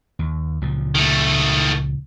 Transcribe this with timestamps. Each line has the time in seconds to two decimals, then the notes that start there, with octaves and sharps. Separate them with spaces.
0.19 D#2
0.61 C#2 A#2 F3
0.95 D#3 A3